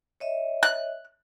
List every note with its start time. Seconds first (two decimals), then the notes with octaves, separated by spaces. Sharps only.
0.20 C#5 D#5 E5
0.63 F#6